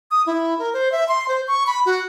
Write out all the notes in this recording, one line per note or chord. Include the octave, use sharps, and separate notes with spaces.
D#6
E4
A#4
C5
E5
C6
C5
C#6
B5
F#4